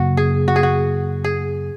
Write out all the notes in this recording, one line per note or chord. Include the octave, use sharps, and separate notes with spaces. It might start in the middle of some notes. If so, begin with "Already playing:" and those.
Already playing: F#2 C#3 A#3 F#4
G#4
F#4
G#4
F#4
G#4